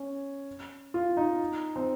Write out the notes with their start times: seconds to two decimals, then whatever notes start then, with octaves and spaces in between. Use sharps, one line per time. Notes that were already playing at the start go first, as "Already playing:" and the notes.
Already playing: C#4
0.94 F4
1.17 D#4
1.76 C4